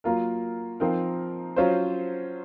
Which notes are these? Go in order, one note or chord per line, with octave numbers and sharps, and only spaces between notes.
F#3 A#3 F4 A#4
F3 C4 D#4 A#4
F#3 C#4 F4 C5